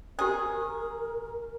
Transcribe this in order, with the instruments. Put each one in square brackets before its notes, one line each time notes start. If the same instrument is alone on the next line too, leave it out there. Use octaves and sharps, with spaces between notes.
[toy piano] G4 C5 [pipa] G#4 [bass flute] A#4